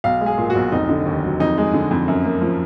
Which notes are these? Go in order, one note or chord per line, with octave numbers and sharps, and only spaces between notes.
B1 F5
G#3
G#4
A#2
F#4
B1
F1 D#4
D3
D#2
F#3
F2 D#4
G#3
D3
F2
F#2
A#3
F3